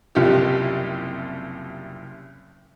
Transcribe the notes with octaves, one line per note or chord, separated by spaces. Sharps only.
F#1 C2 F3 G4